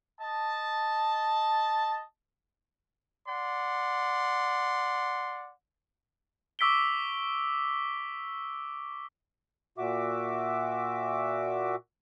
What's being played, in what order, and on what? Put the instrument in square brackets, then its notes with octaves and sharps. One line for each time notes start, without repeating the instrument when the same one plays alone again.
[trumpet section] D#5 A5
D5 F#5 C6
[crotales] C#6 D6 E6 B6 D7 G7
[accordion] A#2 F#4 E5 D6